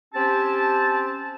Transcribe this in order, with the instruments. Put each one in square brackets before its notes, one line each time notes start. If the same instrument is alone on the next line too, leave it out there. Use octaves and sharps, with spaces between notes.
[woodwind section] C4 C#4 G4 A5